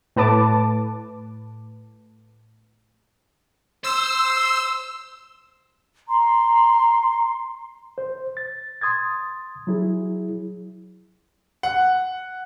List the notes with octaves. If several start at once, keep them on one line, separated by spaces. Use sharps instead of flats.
A2 B4 A5 D6
C5 E6
A#5 C6
C5
A6
C6 D#6 G#6 A6
F#3 E4 G#4
F#5